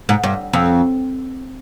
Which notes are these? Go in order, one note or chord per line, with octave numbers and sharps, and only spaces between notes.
G#2
G2
F2